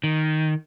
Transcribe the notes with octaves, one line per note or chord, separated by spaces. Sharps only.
D#3